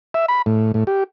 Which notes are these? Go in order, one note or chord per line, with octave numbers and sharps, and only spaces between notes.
E5
B5
A2
A2
G4